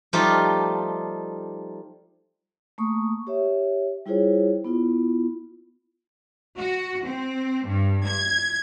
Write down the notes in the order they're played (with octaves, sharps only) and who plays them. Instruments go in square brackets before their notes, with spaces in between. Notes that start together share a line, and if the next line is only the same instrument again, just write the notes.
[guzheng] F3 G3 A3 D#4 F4 G4
[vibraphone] A3 A#3 C#6 D#6
G4 C#5 E5
G3 E4 F4 G#4 C5 C#5
B3 E4 F4
[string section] F#4
C4
G2
G#6